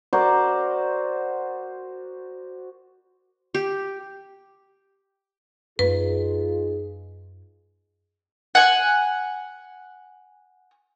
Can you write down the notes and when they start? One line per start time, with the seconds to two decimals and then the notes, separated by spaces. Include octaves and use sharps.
0.13 F#4 A#4 C5 D5
3.54 G4
5.79 F#2 A#3 D#4 F4 G#4 B4
8.55 F#5 G#5